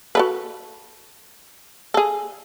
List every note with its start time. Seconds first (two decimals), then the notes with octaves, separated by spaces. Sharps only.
0.15 F#4 A4 B4
1.94 G#4 A4